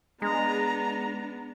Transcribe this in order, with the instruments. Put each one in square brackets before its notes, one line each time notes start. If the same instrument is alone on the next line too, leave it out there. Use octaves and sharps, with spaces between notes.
[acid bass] G#3 [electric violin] B3 D4 [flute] A#5